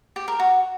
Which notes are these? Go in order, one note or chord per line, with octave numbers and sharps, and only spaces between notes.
G4
A#4
F#4